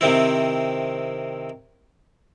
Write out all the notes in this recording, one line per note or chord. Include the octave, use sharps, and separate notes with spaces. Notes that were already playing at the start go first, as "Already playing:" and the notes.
C3 D#3 C4 E4